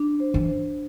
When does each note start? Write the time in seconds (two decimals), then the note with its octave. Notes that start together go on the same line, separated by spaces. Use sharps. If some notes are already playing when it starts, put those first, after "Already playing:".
Already playing: D4
0.20 C5
0.34 E3
0.48 C5